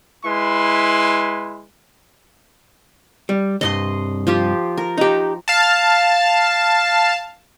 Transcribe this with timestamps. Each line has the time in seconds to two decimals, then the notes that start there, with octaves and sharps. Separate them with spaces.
0.25 G#3 E4 B4 C6
3.29 G3
3.61 C2 G2 D#5 C6
4.27 F3 F4 G4
4.77 A#4
4.98 D#4 G4
5.48 F5 A5